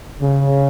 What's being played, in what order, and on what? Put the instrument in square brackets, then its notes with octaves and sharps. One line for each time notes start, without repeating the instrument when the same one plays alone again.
[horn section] C#3